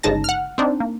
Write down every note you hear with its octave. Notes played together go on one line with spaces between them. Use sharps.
G1 C#3 G#3 D#4 A5 A#6
F#5 F6
C4 D4 D#4
A#3